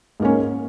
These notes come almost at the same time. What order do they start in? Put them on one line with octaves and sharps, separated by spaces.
G#2 A#3 C#4